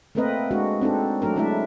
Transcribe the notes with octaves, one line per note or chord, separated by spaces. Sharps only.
A3 A#3 C4 A#4 B4 D#5
G#3 D4 F#4
C4 D4 D#4 A4
F#3 A3 D4 A#4
G#3 A3 D4 E4 E5